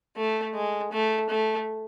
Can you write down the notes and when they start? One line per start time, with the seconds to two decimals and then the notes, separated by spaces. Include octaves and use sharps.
0.17 A3
0.55 G#3
0.92 A3
1.29 A3